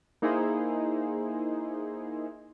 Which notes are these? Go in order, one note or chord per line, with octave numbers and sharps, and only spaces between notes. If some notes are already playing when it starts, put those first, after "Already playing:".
A#3 D#4 E4 G#4 C5